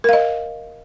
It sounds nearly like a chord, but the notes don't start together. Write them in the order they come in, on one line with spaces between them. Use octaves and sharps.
A#4 F5 D#5